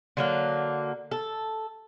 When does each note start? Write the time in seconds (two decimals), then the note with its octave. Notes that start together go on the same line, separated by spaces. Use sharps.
0.17 D3 F#3 A#3
1.11 A4